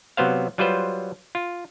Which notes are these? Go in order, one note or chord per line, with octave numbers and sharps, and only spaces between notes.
C3 F#3 B3 C5 F5
F#3 G3 F4 B4 C5
F4